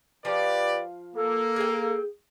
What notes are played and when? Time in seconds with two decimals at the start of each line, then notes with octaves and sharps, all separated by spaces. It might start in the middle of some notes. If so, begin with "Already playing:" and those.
0.25 F3 G4 B4 D5 F5
1.16 A#3 A4
1.56 G#4 G5